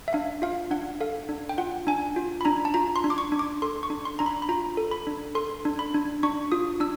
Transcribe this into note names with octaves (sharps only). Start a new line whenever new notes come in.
E5
D4 F5
F4 F5
D4 F#5
A4 F5
D4
G5
F4 F#5
D4 G#5
F4
B5
D4 A#5
A5
F4 A#5
C6
D4
D6
C#6
D4
D6
A4 C6
C#6
D4
C6
D4 A#5
B5
B5
F4 A#5
A4
B5
D4
A4 C6
D4
B5
D4
D4 C#6
F4 D#6
D4 E6